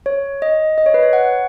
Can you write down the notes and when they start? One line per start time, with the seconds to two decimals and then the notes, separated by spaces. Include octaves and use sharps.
0.06 C#5
0.42 D#5
0.78 D#5
0.86 C#5
0.94 B4
1.03 C#5
1.13 F#5